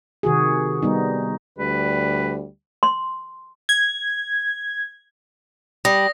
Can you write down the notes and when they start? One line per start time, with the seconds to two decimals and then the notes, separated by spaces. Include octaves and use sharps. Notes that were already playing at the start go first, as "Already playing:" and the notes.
0.23 C3 D#3 F#4 G#4
0.82 G3 B3 D#4
1.59 D2 G3 B4
2.83 C6
3.69 G#6
5.85 G3 D#6 A#6